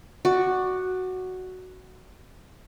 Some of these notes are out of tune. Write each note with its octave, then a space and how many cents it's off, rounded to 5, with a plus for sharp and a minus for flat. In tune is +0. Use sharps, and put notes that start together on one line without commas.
F#4 +0 D5 +20